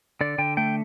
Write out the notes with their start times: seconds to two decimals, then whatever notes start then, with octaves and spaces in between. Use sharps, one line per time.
0.21 D3 D5
0.38 D3 G5
0.57 A3 G5